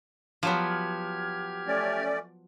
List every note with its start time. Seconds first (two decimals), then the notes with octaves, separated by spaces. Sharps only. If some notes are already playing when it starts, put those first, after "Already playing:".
0.43 F3 F#3 B3 G4 F6 G#6
1.67 A3 C#4 D5